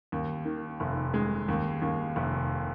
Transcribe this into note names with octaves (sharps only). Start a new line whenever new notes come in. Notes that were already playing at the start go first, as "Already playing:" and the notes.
D#2
D#3
F1
G#3
D#2
D#2
F1